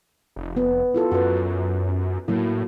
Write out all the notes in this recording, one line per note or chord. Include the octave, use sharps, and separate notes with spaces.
F1
B3
E4 F4 A4
F#2 F#4 B4
A2 F#3 A#3 E4